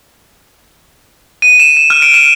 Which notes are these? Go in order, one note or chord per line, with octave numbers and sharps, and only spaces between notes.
D#7
E7
E7
F6
D7
E7